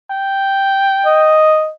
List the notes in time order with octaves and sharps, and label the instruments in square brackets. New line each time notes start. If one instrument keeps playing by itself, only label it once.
[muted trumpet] G5
[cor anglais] D#5